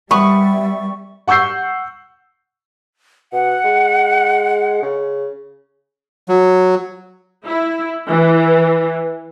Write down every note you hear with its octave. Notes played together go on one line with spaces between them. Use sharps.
G3 B3 E5 C#6
F#5 C#6 E6 G6 C7
B2 F#5
G#3
C#3
F#3
E4
E3